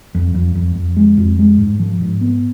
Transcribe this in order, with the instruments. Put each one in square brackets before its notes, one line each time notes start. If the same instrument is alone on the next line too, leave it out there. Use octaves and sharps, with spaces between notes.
[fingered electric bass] F2
F2
F2
F2
G#3
F2
G#3
G#2
F3
G#2
B3